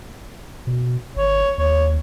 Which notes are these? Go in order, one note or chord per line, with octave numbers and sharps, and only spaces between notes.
B2
G#1 C#5
D#2 C#5